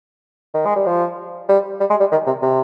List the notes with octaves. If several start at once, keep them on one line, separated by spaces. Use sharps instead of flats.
D#3
G#3
G3
F3
G3
G3
G#3
G3
D#3
C3
C3